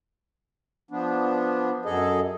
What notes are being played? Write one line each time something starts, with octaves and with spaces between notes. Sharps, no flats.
F3 B3 D4
F#2 G#4 A4 D#5